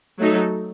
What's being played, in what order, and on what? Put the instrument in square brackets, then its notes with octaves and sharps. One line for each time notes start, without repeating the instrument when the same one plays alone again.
[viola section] F#3 A3 D#4 A4